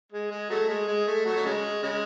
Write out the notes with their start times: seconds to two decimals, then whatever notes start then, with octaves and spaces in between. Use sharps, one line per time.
0.12 G#3
0.31 G#3
0.50 F#3 A3
0.69 G#3
0.88 G#3
1.07 A3
1.25 F#3 A3
1.36 F#3
1.45 C#3 G#3
1.83 C#3 G#3